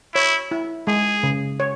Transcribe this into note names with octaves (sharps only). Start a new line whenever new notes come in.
E4 C#5
E4
G#3 G#4
C#3
C#5